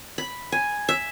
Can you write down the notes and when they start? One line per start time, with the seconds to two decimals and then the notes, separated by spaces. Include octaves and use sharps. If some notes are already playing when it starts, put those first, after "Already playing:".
0.18 B5
0.52 G#5
0.89 E5